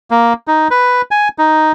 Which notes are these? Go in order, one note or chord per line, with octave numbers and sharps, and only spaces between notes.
A#3
D#4
B4
G#5
D#4